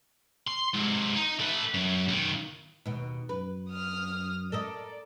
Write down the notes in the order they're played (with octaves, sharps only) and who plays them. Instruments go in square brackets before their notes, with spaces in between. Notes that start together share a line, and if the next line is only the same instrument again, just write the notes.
[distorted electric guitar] C6
G#2 C3
D#4
A3 B4
F#2
B1 D#3
[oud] D#2 B2
[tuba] F#2 [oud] B4
[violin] D#6 F6
[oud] A4 A#4 D#5 [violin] D5